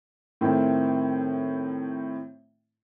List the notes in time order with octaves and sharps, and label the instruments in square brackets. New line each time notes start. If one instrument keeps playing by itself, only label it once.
[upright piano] A2 D#3 C4 E4